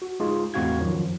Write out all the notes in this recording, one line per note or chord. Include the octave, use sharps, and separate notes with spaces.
F#4
G#3 D#4 F4 G#4
E2 A2 C4 F#4 F5 G#6
F#2 D#3 F3 F#3